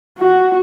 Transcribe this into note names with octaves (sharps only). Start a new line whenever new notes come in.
F#4